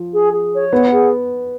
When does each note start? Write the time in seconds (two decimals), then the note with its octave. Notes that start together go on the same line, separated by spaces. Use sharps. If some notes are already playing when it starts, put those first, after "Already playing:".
Already playing: F3
0.13 G#4
0.32 G#4
0.52 C#5
0.71 B3 F#5
0.92 G#4